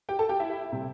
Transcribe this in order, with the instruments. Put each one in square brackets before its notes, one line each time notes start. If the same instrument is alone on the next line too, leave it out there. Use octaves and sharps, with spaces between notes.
[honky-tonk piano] G4 G5
A4 A5
G4 G5
E4 E5
C3 G3 C4